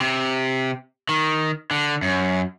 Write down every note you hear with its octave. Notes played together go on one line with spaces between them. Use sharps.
C3
D#3
D3
F#2